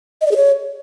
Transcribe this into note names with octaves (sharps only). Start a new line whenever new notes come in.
D#5
D5
G#4
C#5